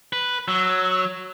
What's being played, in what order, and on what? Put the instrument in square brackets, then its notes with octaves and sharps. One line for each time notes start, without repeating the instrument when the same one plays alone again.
[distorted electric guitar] B4
[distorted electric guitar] F#3 [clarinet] E6